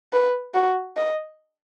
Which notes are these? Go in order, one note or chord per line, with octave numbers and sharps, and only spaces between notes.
B4
F#4
D#5